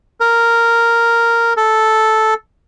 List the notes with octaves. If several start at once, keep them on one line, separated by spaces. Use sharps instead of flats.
A#4
A4